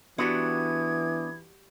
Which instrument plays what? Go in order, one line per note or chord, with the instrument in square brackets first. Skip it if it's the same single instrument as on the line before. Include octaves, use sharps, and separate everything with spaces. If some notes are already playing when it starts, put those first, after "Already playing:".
[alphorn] E3 [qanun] G3 F#4 F#5 [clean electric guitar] B3 D4 [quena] G#6